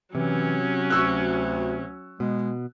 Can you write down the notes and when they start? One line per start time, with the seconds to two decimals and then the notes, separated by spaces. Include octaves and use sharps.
0.15 C3 E3 F#3 C#4
0.90 D2 C#6 E6 F#6
2.20 B2 G#3